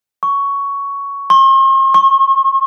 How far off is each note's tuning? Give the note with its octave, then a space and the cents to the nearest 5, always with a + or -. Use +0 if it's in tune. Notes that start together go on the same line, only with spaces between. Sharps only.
C#6 +10
C6 +45
C#6 -35